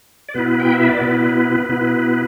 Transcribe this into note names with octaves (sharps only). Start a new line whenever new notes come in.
D5
B2 B3 E4 B4
G5
E5
D5
B2 B3 E4 B4
B2 B3 E4 B4